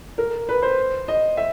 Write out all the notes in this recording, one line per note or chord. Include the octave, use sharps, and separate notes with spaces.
A#4
B4
C5
D#5
E5